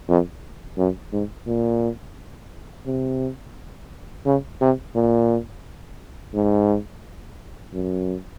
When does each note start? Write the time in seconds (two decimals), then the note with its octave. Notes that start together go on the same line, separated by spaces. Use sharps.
0.09 F2
0.78 F#2
1.12 G#2
1.47 A#2
2.86 C3
4.25 C#3
4.61 C3
4.95 A#2
6.34 G#2
7.74 F#2